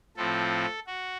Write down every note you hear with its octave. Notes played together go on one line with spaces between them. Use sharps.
A2 F3 C4 A4
F#4